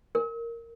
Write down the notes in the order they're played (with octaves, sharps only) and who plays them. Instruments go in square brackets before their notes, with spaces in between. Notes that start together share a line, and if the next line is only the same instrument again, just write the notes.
[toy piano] A#4